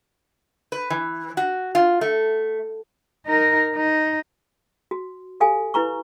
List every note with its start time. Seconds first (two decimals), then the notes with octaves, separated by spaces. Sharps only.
0.72 B4
0.90 E3
1.37 F#4
1.75 F4
2.01 A3
3.27 D#4 A#4
3.75 D#4
4.91 F#4
5.40 G4 A4 F5 G#5
5.74 E4 B4 A#5 C#6